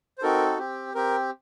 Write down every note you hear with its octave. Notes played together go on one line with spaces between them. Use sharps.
C5
C4 D#4 F#4 A4 A#4
C4 G4
C4 G4 A#4